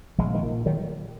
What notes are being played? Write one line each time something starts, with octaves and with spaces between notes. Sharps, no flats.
A#1 F3 G#3
D#3
A#2
D#3 F#3